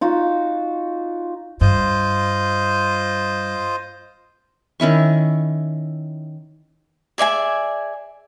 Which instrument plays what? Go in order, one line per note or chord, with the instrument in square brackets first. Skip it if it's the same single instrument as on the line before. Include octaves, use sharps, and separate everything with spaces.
[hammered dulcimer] D#4 F4 F#4
[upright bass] G2 [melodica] F4 C5 D#5
[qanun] D#3 C#4 E4 C#6
[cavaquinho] G#4 D5 E5 G#5